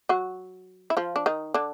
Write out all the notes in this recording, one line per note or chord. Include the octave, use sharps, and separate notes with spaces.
F#3 F#4
E4
F3 F4
D4
D#3 D#4
D3 D4